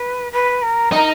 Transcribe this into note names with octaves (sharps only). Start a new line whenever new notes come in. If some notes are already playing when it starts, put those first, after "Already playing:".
Already playing: B4
B4
A#4
D#4 A#4